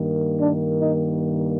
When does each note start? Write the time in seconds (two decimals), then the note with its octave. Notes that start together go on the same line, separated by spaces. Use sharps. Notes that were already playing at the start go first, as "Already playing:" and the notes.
Already playing: G2 D#3 A#3
0.40 D4
0.81 D#4